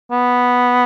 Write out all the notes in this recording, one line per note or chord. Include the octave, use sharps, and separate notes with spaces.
B3